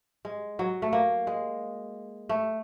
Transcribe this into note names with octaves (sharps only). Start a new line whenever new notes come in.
G#3
F#3
A3
A#3
G#3
A3